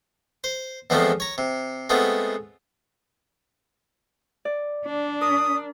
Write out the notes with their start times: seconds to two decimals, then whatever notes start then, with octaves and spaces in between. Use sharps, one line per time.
0.44 C5
0.90 E2 F3 G#3 A3 C4
1.20 C#5 A#5
1.38 C3
1.90 G#3 A3 B3 C4 F4
4.45 D5
4.86 D4
5.21 A#4 D#6